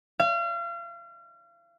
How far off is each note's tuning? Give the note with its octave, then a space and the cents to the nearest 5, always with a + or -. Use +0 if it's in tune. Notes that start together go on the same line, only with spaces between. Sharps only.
F5 -35